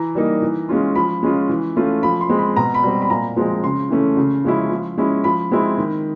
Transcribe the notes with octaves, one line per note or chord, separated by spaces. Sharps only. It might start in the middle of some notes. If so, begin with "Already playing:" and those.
Already playing: E3 A#5
G3 A#3 D#4
E3
G#3 C#4 F4
F3 B5
G#3 C#4 F4
E3
A3 C#4 F4
F3 B5
C6
G#3 C4
B5
B2 A#5
B5
G3 C4
B5
A#2 A#5
F3 G#3 C4
C#3 C6
E3 A3 C#4
C#3
F3 G#3 C#4 E4
F3
G#3 C#4 E4
F3 B5
G#3 C4 E4
D#3